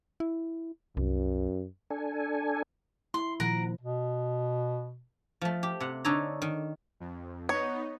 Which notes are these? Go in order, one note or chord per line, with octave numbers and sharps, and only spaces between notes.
E4
C2 F#2
D4 A4 G#5
E4 C6
A#2 D#3 F3 A#4 F#5 A#5
B2
F3 A3
G4
C3 F#5
D3 D#4 A4 C#5 A#5
D#3
F2
B3 D#4 C#5